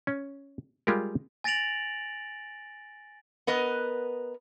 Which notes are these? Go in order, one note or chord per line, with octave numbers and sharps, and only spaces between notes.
C#4
G3 G#3 F4 G4 A#4
G#5 A6 A#6 D7 F7 F#7
B3 A#4 B4 D#5